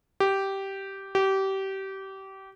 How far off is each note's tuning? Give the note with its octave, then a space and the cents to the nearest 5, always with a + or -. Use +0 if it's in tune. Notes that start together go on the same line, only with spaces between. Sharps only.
G4 -10
G4 -25